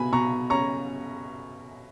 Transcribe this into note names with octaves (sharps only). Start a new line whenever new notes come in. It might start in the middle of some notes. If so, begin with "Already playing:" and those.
Already playing: B2 G#5 B5
B2 A#5 C#6
C#4 A#5 C#6